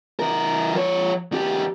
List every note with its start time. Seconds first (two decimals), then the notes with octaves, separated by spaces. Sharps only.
0.19 E3 A#4
0.75 F3 C#5
1.32 E2 G4